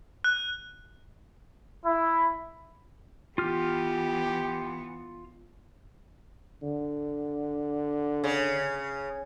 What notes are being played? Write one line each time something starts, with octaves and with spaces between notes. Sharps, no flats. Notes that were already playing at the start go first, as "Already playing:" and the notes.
F#6
E4
E3 B3 F4 G4 F6
D3
C#3